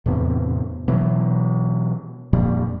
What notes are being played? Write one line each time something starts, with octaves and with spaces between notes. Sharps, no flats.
E2 A2 C3 B3
B2 E3 F#3
F2 A#2 G3